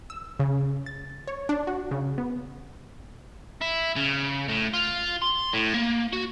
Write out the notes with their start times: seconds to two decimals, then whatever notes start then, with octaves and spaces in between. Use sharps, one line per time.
0.10 E6
0.40 C#3
0.86 A6
1.27 C#5
1.49 D4
1.67 F#4
1.91 C#3
2.18 B3
3.62 E4
3.96 C#3
4.48 A2
4.74 F4
5.22 C6
5.53 A2
5.74 A#3
6.13 F#4